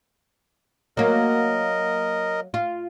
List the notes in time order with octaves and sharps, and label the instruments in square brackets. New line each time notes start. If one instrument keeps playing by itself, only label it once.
[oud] F#3 A#3 [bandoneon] A#4 D#5
[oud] F4